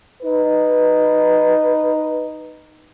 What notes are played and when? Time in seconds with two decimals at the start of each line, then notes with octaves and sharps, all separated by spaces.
0.22 D#4 B4